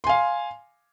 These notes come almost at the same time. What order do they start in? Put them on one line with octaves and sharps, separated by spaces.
C6 G#5 F5